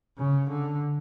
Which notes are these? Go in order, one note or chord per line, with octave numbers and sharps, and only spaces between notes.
C#3
D3